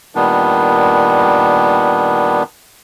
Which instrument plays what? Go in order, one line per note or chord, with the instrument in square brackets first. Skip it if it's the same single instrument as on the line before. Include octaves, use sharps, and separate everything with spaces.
[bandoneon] A#2 D#3 G3 B3 D4